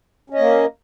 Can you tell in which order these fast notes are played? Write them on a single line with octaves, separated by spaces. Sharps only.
C#4 D#5 A#3